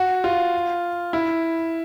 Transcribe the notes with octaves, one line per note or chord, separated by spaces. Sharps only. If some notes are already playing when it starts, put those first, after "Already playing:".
Already playing: F#4
F4
E4